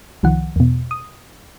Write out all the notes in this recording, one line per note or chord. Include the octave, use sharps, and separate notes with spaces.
C2 D#3 F3 F#5
E2 B2
D#6